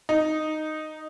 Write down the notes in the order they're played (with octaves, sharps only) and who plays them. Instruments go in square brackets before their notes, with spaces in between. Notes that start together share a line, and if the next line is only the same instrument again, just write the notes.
[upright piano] D#4